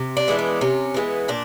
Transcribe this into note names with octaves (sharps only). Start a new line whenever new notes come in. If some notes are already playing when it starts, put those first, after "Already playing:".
Already playing: C3
D4
E3 G#3 B3
D4
C3 C#4
E3 G#3 B3
A#2 D4